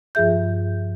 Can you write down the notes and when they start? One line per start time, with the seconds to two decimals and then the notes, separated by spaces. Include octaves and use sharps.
0.15 G2 F3 F4 G#4 E5 G6